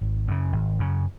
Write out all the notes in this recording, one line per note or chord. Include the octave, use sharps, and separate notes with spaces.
G#1
F#2 C#3
G#1
F#2 C#3